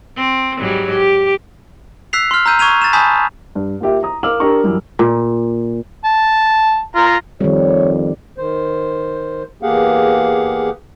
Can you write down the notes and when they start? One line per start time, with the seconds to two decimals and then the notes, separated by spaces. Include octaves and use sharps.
0.16 C4
0.58 G#2 F#3 G3
0.90 G4
2.13 E6 F#6 B6 C7 F7
2.31 C6 F6
2.46 A#5 E6 G6 D#7
2.59 C#6 G#6 D#7 F7
2.81 A6 E7
2.93 G#5 A5 B5 D#6 G6 B6
3.55 G2
3.81 A#3 F4 G4 E5
4.03 A#5 D#6
4.23 A#4 F5 D6 E6 F6 F#7
4.40 D4 G4 A#4 A#5 C#6
4.63 F#2 E3 G3
4.99 A#2
6.04 A5
6.95 F4 A#5
7.41 F2 D#3 G3 C#5
8.38 D#3 C5
9.63 E2 A#3 G4 G#4 F5 F#5